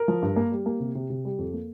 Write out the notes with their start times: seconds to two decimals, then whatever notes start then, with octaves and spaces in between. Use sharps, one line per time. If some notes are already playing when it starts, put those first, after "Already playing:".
Already playing: A#4
0.08 F3
0.22 G2
0.36 A#3
0.51 G3
0.66 A#3
0.80 C3
0.95 C3
1.10 C3
1.25 G3
1.38 F2
1.54 A#3